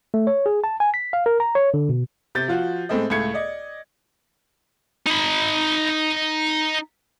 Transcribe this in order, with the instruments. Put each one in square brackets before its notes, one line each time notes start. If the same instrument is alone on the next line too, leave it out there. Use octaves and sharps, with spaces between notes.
[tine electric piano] A3
C#5
G#4
A5
G#5
B6
F5
A#4
A#5
C#5
D3
B2
[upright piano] C3 G6 A6
F3 F4 F#4
A2 G#3 C4 A4 D#5
C#2 A2 A3 G#6 C#7
D5 D#5
[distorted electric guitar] D#4 B5